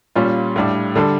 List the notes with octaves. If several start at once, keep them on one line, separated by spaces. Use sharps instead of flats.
A#2 G3 C#4 F4
A2 G3 D4
D3 G3 D4 A4